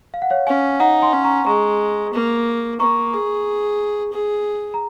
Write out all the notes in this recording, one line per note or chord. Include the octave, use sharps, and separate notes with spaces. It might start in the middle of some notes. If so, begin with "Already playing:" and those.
F5
F#5
C#5 F5
C#4 F5 G#5
D#4 F#5 A#5
G#5 C6
C#4
A#5 C#6
G#3 A#5 C#6
A#3
A#3 A#5 C#6
G#4
G#4
A#5